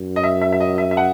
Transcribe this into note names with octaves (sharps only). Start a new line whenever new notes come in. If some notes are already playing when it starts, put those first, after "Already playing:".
Already playing: F#2
D#5
E5
E5
E5
D#5
E5
E5
F#5